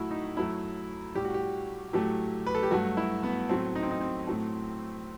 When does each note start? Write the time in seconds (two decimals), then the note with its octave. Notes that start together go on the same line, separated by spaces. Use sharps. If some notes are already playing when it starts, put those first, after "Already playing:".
Already playing: A2 F#3 A3 E4 F#4
0.11 D#4
0.37 F#2 F#3 A3 E4
1.15 A2 G3 G4
1.25 F#4
1.34 G4
1.93 A2 F#3 A3 G4
2.46 B4
2.55 A4
2.63 G4
2.71 G2 F#3 A3 F#4
2.97 E4
3.23 B3
3.49 A2 F#3 A3 C4
3.75 D#4
3.83 C4
3.91 D#4
4.01 C4
4.27 A2 F#3 A3